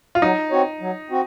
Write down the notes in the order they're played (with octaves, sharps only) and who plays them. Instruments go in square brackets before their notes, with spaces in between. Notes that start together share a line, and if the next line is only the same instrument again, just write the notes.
[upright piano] F4
[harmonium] F#3 [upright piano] D#4
[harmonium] C4 F#4 C#5
F#3
C4 F#4